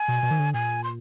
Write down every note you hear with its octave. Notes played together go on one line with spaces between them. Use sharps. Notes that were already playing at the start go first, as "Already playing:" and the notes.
Already playing: G#5
B2
B2
D#3
D3
A#2 G#5
C6